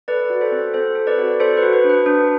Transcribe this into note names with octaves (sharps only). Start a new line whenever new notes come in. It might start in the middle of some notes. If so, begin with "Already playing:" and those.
A4 B4 D5
F#4
A4 C5
C4
C4 A4 C5
A4
B4 D5
F#4
A4 C5
B4
F#4
B4
D4
B4
D4